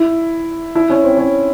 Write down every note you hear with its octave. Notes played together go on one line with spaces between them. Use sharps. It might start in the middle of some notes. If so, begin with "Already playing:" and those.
Already playing: E4
E4
C#4
C4
C#4